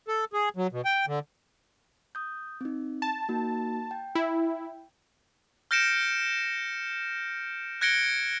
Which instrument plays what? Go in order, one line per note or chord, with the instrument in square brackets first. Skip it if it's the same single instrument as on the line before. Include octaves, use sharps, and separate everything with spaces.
[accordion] A4
G#4
F#3
B2
G5
D3
[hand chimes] D#6 G6
C4 D#4
[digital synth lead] A5
[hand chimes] A#3 D#4 F#4
G5
[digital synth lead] E4
[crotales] F6 G6 A#6 C#7 D7 E7
F#6 G#6 A#6 C#7 D7 G7